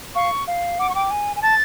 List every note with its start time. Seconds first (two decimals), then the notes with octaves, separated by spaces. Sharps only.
0.15 F5 C#6
0.47 F5
0.79 F#5 D6
0.90 C#6
0.95 G5 D6
1.11 G#5
1.36 G#5
1.42 A5 A6